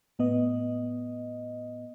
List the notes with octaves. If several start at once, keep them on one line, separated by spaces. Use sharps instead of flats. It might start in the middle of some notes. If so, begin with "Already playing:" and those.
A2 B3 D#5